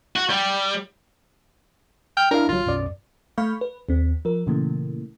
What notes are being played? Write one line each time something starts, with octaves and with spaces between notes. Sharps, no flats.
F#4
G3
G5 F6
D4 E4 A#4 F5
G1 F#3 F4
B1 F#2 D5
A3 F5 B5 C#6 F6 G6
B4
D#2 C4
F3 A#4
A#2 C#3 E3 A3 A#3